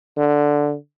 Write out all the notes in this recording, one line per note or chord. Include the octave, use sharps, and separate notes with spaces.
D3